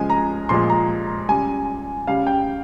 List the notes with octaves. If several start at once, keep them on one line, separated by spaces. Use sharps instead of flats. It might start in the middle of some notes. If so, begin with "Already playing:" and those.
Already playing: C#3 F3 G#3 G#5
A#5
A#2 F3 G#3 C6
A#5
C#3 G3 G#5
C#3 G3 F5
G5